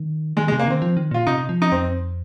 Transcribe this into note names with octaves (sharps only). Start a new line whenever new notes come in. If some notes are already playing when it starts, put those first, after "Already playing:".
Already playing: D#3
D#3 G#3
G#3
C3
A#3
D#3 C4
F3
D#3
A#2 F4
C3 D#4
F3
D#4
F2 C4